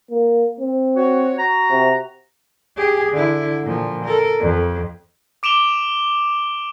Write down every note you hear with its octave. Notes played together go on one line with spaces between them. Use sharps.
A#3
C4
F#4 C#5
F#4 A#5
C3
G4 G#4
D3 E4
A#2 F3
A4 A#4
F2
D6 D7 E7 F7 G7